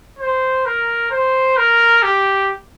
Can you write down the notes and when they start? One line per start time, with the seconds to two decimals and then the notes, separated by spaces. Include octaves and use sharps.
0.19 C5
0.65 A#4
1.10 C5
1.57 A#4
2.03 G4